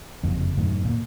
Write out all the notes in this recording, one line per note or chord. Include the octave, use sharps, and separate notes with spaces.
F#1 F2
F#2 A2 D#3
A#2